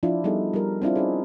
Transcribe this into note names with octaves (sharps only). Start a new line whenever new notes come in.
F3 D4 E4 F4
G3 B3 D#4 E4 G#4 A4
G3 A#4
C4 D4 E4 F4
C#4 D#4 G#4